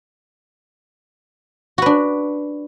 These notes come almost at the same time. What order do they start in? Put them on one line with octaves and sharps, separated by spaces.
F#4 B4 D4